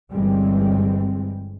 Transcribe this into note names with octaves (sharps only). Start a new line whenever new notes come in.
G1 E3 G3 G#3 C4